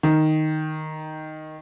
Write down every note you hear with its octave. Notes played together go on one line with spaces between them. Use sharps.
D#3